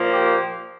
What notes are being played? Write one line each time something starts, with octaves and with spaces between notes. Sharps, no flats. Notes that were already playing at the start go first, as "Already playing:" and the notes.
Already playing: A#2 F3 A#3
G4